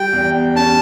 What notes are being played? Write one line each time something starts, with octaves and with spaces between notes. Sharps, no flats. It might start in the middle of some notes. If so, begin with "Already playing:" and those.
Already playing: G3 G5
E2
C#4 A5